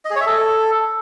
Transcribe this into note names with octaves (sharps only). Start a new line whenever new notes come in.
D#5
G#4
C#5
E5
A4